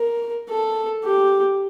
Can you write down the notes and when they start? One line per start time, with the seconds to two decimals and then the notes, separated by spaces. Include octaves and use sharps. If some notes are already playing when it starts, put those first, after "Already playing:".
Already playing: A#4
0.49 A4
1.04 G4